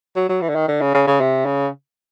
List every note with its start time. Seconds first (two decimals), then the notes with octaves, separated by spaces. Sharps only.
0.16 F#3
0.30 F#3
0.42 E3
0.50 D3
0.55 D#3
0.68 D3
0.82 C#3
0.95 C#3
1.07 C#3
1.21 C3
1.46 C#3